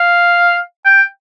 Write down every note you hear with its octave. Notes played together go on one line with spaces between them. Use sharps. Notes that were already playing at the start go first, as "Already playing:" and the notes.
Already playing: F5
G5